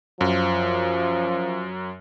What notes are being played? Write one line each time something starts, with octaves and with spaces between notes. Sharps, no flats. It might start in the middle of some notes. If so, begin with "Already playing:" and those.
F#2 F3